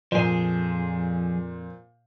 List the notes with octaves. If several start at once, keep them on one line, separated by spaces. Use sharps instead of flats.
F2 A#2 F3 G#4 C5